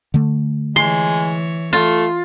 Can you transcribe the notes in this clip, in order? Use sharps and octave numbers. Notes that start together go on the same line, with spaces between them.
D3 A3
E3 G#3 C#5 C6
A3 F4